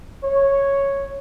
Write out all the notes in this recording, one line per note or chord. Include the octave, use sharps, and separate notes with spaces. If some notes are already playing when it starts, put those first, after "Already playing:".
C#5